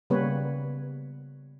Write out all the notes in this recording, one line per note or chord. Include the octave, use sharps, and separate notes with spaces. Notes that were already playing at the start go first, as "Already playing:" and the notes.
C#3 G3 A#3 B3 B4 C#5